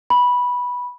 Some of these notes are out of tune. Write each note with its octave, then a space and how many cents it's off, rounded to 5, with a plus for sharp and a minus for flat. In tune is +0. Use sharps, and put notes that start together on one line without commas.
B5 -10